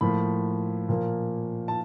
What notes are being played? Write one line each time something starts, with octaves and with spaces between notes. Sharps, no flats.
A2 F3 A#3 B5
A#2 F3 A#3
A5